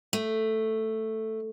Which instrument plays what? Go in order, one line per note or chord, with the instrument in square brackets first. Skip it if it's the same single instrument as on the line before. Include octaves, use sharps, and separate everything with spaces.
[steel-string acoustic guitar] A3